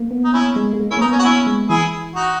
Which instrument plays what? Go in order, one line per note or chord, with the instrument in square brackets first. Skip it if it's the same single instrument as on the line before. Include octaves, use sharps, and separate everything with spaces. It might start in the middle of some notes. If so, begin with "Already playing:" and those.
Already playing: [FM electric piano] A#3
B3
[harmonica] D#4
C#4 E4
[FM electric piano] G#3
G#3
A#3
[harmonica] C#4 E4
[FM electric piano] A#3
[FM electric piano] B3 [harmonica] D#4
[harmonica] C#4
F#4
[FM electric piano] A#3 [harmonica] C#4 E4
[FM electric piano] G#3
[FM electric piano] E3 [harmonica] E4 G#4
[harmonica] D#4 F#4